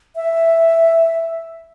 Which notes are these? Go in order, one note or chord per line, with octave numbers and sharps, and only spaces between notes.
E5